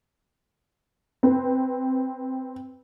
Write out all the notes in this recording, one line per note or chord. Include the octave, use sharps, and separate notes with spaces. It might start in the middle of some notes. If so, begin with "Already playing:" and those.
C4 B4